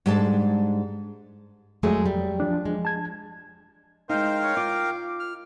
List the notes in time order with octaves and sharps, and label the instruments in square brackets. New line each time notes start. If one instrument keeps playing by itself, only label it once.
[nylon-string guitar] G#2 G3 G#3 D4 A4 A5
[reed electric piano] F2 F#3 [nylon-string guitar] G#3 A3 G#4
[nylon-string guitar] G3
[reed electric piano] F3 D4
[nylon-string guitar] G#3
[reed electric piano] A5 G#6
[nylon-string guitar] G#3 D#4 [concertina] A#4 F5 G5 [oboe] C5
[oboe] C#5
[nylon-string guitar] F4 [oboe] D6
[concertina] F6